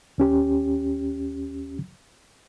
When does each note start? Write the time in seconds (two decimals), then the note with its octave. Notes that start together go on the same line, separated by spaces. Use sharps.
0.18 D#2 C#4 G4